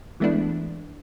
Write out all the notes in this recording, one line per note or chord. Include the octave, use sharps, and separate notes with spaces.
E3 G#3 A3 B3 D4 E4